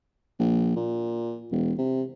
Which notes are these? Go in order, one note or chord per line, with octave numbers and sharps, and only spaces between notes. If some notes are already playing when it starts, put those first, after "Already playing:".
A#1
A#2
E1
C3